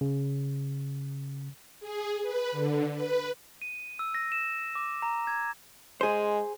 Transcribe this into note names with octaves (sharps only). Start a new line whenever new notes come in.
C#3
G#4
B4
D3
B4
D#7
E6
A#6
E7
D6
A#5
G#6
G#3 G#4 C5